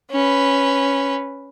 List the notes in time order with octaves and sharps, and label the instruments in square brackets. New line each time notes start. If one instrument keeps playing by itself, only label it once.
[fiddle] C#4 B4